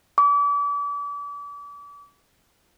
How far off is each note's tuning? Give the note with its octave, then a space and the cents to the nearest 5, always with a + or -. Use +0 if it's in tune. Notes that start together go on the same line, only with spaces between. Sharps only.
D6 -35